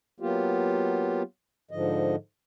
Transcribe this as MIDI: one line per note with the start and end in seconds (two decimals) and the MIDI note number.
0.20 1.22 54
0.20 1.22 58
0.20 1.22 59
0.20 1.22 65
0.20 1.22 67
1.71 2.16 44
1.71 2.16 50
1.71 2.16 53
1.71 2.16 75